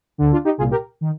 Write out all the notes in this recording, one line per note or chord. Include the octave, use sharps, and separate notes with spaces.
D2 D3
D4 F4
D#4 G4
C2 A#2 F4 G#4
G4 A#4
D#3